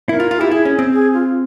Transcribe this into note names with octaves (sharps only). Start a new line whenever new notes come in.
E4 A#4
F4
F4
E4 G4
E4 G#4
C#4
C4
G#4
F4